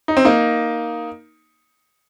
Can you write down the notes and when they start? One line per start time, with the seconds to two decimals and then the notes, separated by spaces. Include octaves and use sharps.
0.08 D#4
0.17 C4
0.25 A#3 D#4